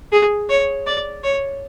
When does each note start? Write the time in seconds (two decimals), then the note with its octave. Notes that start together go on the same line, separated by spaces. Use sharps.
0.12 G#4
0.49 C#5
0.87 D5
1.23 C#5